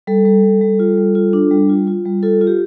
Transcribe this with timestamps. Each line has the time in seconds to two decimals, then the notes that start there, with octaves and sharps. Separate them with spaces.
0.07 G3 A4
0.25 G3
0.43 G3
0.61 G3
0.79 F4
0.98 G3
1.15 F4
1.33 D4
1.51 G3
1.69 F4
1.87 F4
2.05 G3
2.23 F4 A4
2.41 F4
2.47 G4